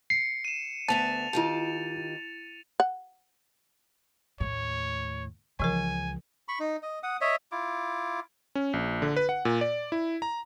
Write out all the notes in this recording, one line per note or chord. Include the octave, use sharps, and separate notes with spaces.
C7 C#7
D#7 E7
D2 B3 E5 A5 A6 F7
D#3 E4 F4 G4 A5
F#5
D#2 A2 C#5
C#2 E3 F3 A#4 G#5
B5 C#6
D#4
D#5
F#5 D#6
C#5 D#5 E5
E4 F4 D6
C#4
A#1
D3
B4
F#5
A#2
D5
E4
A#5